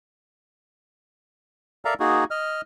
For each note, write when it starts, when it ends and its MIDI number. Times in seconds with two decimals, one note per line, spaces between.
1.85 1.94 69
1.85 1.94 70
1.85 1.94 74
1.85 1.94 76
1.85 1.94 77
1.85 1.94 82
2.00 2.24 58
2.00 2.24 63
2.00 2.24 66
2.00 2.24 68
2.31 2.61 75
2.31 2.61 89